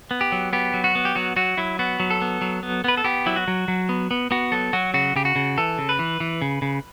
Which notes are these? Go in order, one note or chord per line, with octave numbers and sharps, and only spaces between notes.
B3
G4
F#3
B3 G4
F#3
F#4
B3
G4
F#3 F#4
F#3 F#4
F#3 E4
B3 F#4
F#3
A4
B3
F#3
B3
B3 B4
A4
B3 G4
F#3 E4
F#4
F#3
F#3
B3
B3
B3 F#4
F#3 A4
F#3 F#4
C#3 F#4
C#3 G4
F#4
C#3
E3 A4
C#3
B4
E3
E3
C#3
C#3